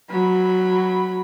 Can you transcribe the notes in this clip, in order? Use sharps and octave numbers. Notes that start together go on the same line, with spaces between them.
F#3 B5